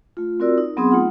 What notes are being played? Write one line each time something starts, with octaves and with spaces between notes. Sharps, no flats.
A3 F4
C4 F4 F#4 A#4 D5 E6
D#4
F#3 B3 C4 G#4 C6 D#6
A3 D#4 F4 F#5